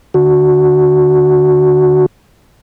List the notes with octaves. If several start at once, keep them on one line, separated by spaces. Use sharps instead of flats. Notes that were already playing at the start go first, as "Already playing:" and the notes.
D3 F#4